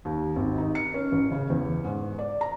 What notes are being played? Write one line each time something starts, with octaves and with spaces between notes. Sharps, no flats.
D#2
G#1
D#4
C#7
C#4
A1
C#3
E2
G#2
D5
A#5